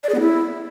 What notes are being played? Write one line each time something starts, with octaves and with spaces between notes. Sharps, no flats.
D5
G#4
B3
E4